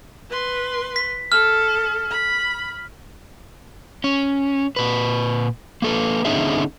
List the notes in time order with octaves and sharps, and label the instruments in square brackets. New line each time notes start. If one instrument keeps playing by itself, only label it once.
[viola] B4 C6
[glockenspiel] B6
[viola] A4 [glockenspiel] F6
[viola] B5
[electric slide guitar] C#4
A#2 B4
A#3 A4 B4
D3 B3 C#4 D#4 G#4 E5